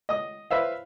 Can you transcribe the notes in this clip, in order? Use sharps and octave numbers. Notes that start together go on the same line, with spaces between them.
D#5 D#6
B4 C5 E5 F5